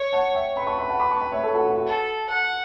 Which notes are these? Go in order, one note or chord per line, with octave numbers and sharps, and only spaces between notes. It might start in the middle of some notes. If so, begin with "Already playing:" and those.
Already playing: C#5
F#5 A5
E5 G5
B4 G5 B5
A5 C#6
G5 B5
F#5 A5
B5 D6
A5 C#6
G5 B5
C#5 E5
A4 C#5
F#4 A4
F#4
F#4
A4
F#5